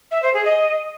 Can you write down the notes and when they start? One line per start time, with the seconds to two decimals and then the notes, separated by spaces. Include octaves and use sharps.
0.11 E5
0.23 C5
0.34 G#4
0.45 D#5